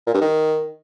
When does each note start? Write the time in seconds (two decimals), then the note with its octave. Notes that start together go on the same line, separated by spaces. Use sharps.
0.07 A#2
0.14 G2
0.21 D#3